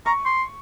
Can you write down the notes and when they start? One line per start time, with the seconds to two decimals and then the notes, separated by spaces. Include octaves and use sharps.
0.06 A#5 C#6
0.25 C6